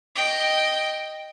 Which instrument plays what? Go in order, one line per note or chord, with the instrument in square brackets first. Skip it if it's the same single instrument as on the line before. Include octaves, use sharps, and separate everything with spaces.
[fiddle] D#5 G5